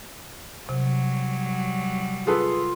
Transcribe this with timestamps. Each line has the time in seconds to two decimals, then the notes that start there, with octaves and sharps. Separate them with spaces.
0.69 C3 F#3 G3
2.27 F4 G#4 A4 B4